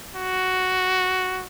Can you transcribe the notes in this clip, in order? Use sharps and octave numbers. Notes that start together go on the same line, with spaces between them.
F#4